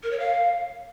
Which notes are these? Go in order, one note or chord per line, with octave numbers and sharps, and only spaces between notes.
A#4
C#5
F5